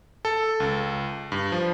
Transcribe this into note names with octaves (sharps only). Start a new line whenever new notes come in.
A4
C#2
G2
F3